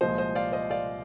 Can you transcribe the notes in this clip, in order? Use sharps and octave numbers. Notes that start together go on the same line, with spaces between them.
C2 A#2 F3 G#3 C5 D#5
C5 D#5
D5 F5
C5 D#5
D5 F5